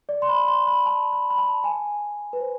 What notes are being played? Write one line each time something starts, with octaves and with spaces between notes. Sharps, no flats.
D5
C6
B5
C6
B5
A5
B5
B5
A5
G#5
B4
C5